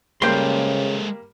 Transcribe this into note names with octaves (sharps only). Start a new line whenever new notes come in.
C#3 G3 G#3 A#3 A4 C5 C6 D7